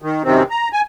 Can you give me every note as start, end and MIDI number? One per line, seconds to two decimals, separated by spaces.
0.02 0.23 51
0.24 0.43 42
0.24 0.43 48
0.24 0.43 51
0.24 0.43 60
0.50 0.69 82
0.73 0.81 80